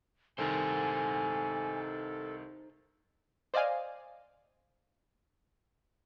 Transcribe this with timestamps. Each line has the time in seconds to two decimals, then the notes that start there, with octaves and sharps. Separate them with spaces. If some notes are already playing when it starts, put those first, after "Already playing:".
0.38 C2 D#3 D#4 A4 C5 G#5
3.54 C5 D5 D#5 F5 G#5